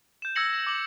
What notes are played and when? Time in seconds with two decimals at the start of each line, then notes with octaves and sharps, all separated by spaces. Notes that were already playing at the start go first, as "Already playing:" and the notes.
0.22 G6 E7
0.35 E6 G#6 A#6 C#7 F#7
0.53 A#6
0.67 D6 F#7